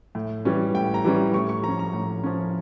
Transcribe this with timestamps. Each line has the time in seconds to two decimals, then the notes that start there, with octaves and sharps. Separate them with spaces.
0.15 A2
0.45 E3 G3 C#4
0.74 A2 G5
0.94 A#5
1.04 E3 G3 C#4
1.34 A2 C#6
1.49 C#6
1.63 F3 C#4 A#5
1.79 A#5
1.93 A2
2.24 F3 C#4